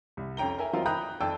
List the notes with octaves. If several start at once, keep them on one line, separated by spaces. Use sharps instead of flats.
C2
F2 C#4 G5 A#5 G7
A#4 E5 G#5
F#3 C4 E4 F4 A#4 D#5
G5 A#5 B5 D#6 F#6 G6
F2 D5 G5 A5 E6